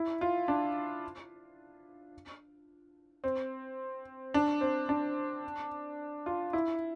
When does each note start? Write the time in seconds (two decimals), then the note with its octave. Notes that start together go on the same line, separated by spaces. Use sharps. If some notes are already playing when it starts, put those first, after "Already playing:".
Already playing: E4
0.21 F4
0.48 D4
3.24 C4
4.34 D4
4.61 C4
4.89 D4
6.26 F4
6.53 E4